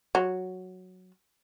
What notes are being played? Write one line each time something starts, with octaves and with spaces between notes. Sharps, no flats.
F#3